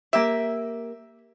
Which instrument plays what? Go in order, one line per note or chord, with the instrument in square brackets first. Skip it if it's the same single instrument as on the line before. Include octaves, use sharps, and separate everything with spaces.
[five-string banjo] A#3 G4 [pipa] E5